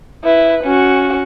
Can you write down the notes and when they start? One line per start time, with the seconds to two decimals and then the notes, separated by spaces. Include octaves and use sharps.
0.24 E4 B4
0.64 C#4 F#4